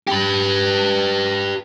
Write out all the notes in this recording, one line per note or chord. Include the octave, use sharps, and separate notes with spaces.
G4 B4